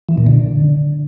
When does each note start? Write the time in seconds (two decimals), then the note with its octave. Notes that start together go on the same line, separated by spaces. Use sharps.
0.09 E3
0.18 A#2
0.27 D3